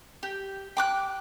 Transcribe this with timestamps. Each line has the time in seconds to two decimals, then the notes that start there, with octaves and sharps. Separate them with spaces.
0.23 G4
0.77 G5 D6 F#6